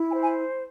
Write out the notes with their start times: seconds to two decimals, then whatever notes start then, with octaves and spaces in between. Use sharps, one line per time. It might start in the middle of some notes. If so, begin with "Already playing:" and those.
Already playing: E4
0.10 G#5
0.15 C5
0.22 G#5